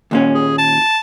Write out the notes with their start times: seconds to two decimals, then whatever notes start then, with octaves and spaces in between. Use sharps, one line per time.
0.11 D#2 A#2 C#4
0.35 G#4
0.58 A5